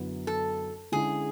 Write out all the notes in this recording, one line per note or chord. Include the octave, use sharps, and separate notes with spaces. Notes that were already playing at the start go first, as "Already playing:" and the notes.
Already playing: F#2 D3 F#3 B3 E4
A4
D3 G#3 C#4 E4 G#4